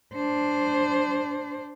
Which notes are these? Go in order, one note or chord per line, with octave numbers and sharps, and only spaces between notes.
D4 C5